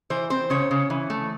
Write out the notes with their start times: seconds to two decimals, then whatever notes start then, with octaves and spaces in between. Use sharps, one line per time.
0.10 E3 C5
0.30 C4 C5
0.50 C#3 C#5
0.71 C#3
0.90 E3
1.10 A3